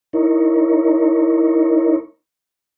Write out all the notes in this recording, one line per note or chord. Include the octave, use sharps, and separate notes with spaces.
D#4 E4 A#4 C#5